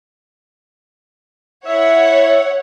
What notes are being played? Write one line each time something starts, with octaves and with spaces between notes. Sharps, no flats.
E4 C#5 E5 F#5